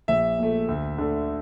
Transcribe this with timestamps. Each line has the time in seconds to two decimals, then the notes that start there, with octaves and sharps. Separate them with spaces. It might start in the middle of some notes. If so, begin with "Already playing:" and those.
0.08 A#1 E5
0.39 A#2 A3
0.68 D2
0.98 D3 A3